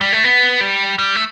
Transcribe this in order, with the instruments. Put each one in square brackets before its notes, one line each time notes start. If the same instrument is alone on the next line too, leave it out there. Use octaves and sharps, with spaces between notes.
[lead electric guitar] G3
A3
B3
G3
G3
A3